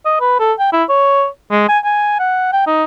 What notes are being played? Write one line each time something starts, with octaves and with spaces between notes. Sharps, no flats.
D#5
B4
A4
G5
E4
C#5
G#3
G#5
G#5
F#5
G5
D#4